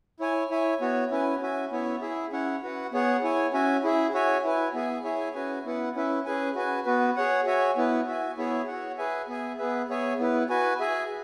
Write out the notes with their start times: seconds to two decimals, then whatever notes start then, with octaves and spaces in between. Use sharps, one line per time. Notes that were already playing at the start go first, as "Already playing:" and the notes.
0.20 E4 C#5 G#5
0.50 E4 C#5 E5 G#5
0.80 B3 F#4 C#5
1.11 C#4 E4 B4 G#5
1.41 C#4 F#4 E5 G#5
1.71 B3 E4 C#5 E5
2.01 E4 G#4 E5
2.32 C#4 E4 C#5 F#5
2.62 F#4 B4 F#5
2.92 B3 G#4 C#5 F#5
3.23 E4 C#5 G#5
3.53 C#4 F#4 E5 G#5
3.83 E4 G#4 E5
4.13 F#4 C#5 E5 G#5
4.44 E4 B4 G#5
4.74 B3 G#4 E5 G#5
5.04 E4 G#4 C#5 E5 G#5
5.35 C#4 F#4 B4 G#5
5.65 B3 E4 B4 F#5
5.95 C#4 E4 B4 E5
6.25 C#4 G#4 B4 G#5
6.56 F#4 B4 G#5
6.85 B3 F#4 B4
7.16 G#4 C#5 F#5
7.46 F#4 C#5 E5 G#5
7.76 B3 E4 B4
8.07 F#4 E5 G#5
8.37 B3 E4 G#4 C#5 E5
8.67 F#4 C#5 F#5
8.98 G#4 B4 E5 G#5
9.28 B3 G#4 E5 G#5
9.58 B3 G#4 B4 E5
9.88 B3 G#4 C#5 E5 G#5
10.18 B3 E4 B4
10.49 F#4 B4 G#5
10.80 G#4 E5 G#5